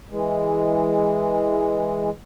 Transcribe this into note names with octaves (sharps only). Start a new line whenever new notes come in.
E3 G#3